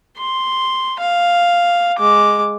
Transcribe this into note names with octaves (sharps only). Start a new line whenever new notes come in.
C6
F5
G#3 D6